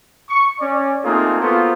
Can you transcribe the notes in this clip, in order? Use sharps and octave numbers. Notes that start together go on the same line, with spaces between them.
C#6
C#4 D5
A3 A#3 C4 D#4 F4 G#4
A#3 B3 F4 F#4 A4 C5